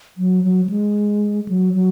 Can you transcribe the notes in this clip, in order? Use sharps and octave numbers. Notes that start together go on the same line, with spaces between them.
F#3
F#3
F#3
G#3
F#3
F#3